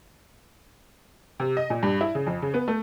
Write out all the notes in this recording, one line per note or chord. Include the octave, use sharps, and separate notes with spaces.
C3
D#5
A#2
G2
E4
C#3
F2
C#3
B3
A3